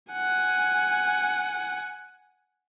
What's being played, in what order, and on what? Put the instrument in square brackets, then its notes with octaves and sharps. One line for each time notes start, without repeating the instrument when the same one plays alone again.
[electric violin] F#5 G#5